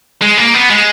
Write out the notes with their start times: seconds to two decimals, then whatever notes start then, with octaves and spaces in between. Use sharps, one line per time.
0.22 G#3
0.37 A#3
0.54 B3
0.70 G#3